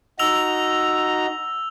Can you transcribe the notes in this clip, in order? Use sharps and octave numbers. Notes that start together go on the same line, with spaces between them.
D#4 F#4 A#5 E6 F7